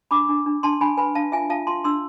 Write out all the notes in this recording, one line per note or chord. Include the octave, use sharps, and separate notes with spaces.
D4 B5 D6
D4
D4
D4 A5 C6
D4 G#5 B5
B4 G#5 B5
D4 F5 A5
F4 E5 G#5
F4 F5 A5
F4 A5 C6
D4 C6 E6